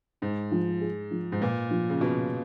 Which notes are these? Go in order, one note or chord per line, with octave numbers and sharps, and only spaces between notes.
G#2 D#4
F3
G#4
F3
G#2
A#2 B4
F3
C#3
B2 F4